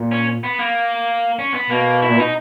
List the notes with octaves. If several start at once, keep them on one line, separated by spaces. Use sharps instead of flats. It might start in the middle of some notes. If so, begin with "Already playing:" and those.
Already playing: A#2
C#4
B3
A#3
C#4
B3
B2 A#3
E4
A#2
B2 D#4